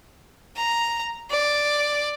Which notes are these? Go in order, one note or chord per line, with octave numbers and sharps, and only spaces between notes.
A#5
D5